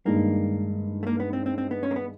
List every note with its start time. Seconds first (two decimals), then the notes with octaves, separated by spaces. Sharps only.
0.05 G2 D#3 G#3 A#3
1.03 A3
1.07 A#3
1.20 B3
1.33 C4
1.46 C4
1.58 C4
1.71 B3
1.83 C#4
1.91 A#3
1.96 B3